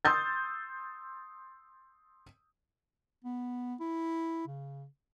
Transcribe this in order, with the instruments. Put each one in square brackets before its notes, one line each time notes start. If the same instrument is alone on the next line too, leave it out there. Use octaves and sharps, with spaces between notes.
[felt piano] C6 D#6 E6 G6 A6
[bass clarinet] B3
E4
C#3